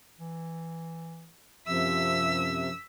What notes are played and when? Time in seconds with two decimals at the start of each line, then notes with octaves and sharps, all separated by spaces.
0.19 E3
1.67 F#2 C3 F3 E5 E6 B6